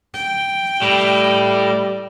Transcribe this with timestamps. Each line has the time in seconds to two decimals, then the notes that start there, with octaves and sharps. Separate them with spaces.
0.14 G5
0.82 A2 G3